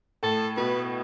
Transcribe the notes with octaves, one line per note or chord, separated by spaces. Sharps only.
A2 A4
B2 B4